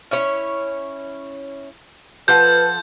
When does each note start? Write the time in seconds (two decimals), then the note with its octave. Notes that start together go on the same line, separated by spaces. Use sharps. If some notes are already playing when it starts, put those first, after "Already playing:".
0.11 C#4 E4 C#5
2.28 F3 A4 B4 F#5 G6